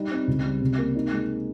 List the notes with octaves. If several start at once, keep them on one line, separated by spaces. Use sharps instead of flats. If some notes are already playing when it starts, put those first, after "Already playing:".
Already playing: G3 D#4
C4
C#2
G3
C3
A#3
D#4
G#3